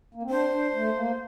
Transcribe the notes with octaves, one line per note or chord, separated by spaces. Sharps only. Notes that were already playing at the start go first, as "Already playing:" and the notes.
A#3
C4
D4 C5
D4
A3
A#3